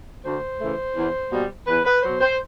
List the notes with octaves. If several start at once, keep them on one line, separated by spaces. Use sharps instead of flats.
D2 C5
C#3 E3 A3
E2
B2 G3 A#3
E2 B4
B4
F#3 C5
B2
C5